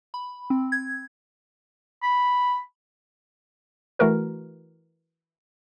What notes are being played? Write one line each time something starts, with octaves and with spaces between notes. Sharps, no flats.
B5
C4
G#6
B5
E3 A3 F#4 A#4 B4